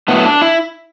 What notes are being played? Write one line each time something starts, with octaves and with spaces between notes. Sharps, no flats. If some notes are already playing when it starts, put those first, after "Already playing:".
A2 F#3 A3 B3
D4
E4